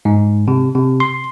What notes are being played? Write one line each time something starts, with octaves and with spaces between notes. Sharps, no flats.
G#2
C3
C3
C6